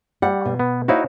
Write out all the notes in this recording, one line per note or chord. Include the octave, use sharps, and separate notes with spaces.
G3 F#5
B2
B3
D#4 E4 F#4 C5 C#5 F5